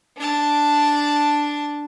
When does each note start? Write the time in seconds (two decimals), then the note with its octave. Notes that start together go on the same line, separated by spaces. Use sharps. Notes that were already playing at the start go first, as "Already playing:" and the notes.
0.17 D4 A5